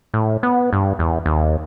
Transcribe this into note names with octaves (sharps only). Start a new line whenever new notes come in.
A2
B3
G2
E2
D#2